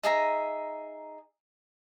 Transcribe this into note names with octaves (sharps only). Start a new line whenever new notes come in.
D#4 G#4 E5 A#5